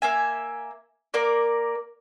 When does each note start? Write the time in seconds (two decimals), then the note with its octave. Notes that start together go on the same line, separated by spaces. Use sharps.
0.02 A#3 E5 G#5
1.14 A#3 A#4 D5